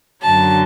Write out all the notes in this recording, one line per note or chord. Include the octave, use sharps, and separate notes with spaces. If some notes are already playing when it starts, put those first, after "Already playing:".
F#2 D3 F#3 A5